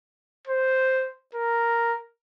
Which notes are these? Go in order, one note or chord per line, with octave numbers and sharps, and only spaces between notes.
C5
A#4